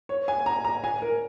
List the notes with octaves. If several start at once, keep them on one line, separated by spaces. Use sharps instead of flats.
C#5
G#5
A#5
A#5
G#5
A#4